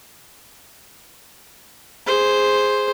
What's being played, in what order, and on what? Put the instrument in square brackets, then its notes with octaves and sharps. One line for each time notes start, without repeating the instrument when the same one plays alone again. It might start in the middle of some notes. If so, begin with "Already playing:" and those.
[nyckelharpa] G#4 C5